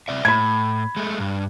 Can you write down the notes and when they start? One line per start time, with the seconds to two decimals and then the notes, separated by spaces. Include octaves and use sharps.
0.08 C3 D5 E5
0.25 A2 B5 G#6
0.97 G#3 A3
1.20 G2